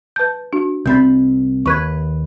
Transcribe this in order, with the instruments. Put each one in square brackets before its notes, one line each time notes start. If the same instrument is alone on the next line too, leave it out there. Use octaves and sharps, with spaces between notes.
[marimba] B4 A5 G6
D4 F#4
[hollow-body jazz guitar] C2 C4 B5 [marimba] G6 A6
[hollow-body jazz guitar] D#2 B4 [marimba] C#6 F#6 G#6